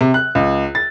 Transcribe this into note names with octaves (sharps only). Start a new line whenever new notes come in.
C3
F#6
C#2
A6